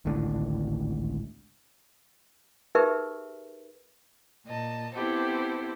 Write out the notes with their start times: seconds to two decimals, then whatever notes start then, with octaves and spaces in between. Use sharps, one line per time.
0.05 G#1 C#2 A2 D3
2.75 D#4 G4 G#4 A#4 B4 E5
4.47 A#2 D#5 A5
4.95 B3 C4 E4 G4 A4 C5